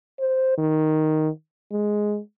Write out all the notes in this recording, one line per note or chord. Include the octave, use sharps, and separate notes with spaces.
C5
D#3
G#3